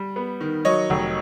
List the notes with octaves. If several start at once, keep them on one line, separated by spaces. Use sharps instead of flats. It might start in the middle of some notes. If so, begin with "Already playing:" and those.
Already playing: G3
B3
D#3
F#3 C#5 D#5
F1